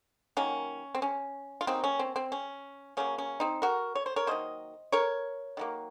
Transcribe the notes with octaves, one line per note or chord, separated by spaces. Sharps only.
D#3 F#3 A#3 C#4
C4
C#4
F4
C#3 F#3 A#3 C4 D#4
C#4
C4
C4
C#4
C#3 F#3 A#3 C#4
C#4
C4 D#4
F#4 A#4
C#5
C5
A#4 C#5
D#3 F#3 A#3 C5 D#5
A#4 C#5
D#3 F#3 A#3